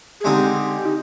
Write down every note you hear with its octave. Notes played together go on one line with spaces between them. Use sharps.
G#4
D3 G#3 C4 D#4 G4
D#4